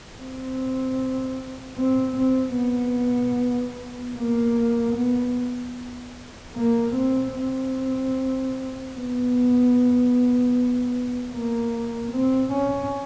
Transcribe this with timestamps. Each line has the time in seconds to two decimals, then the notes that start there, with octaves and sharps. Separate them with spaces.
0.18 C4
1.77 C4
2.17 C4
2.57 B3
4.16 A#3
4.96 B3
6.55 A#3
6.95 C4
7.34 C4
8.93 B3
11.32 A#3
12.11 C4
12.52 C#4